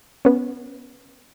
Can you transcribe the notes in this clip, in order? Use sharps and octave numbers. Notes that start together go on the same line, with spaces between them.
B3 C#4